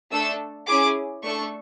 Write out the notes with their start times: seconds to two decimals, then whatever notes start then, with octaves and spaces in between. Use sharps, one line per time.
0.11 A3 D4 A4 E6
0.67 C#4 E4 G#4 D6
1.23 A3 D4 A4 C#6